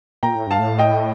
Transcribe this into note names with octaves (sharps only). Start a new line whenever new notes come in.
A#2 G5 A#5
A2
G2 F5 A5
A2
D#5 G5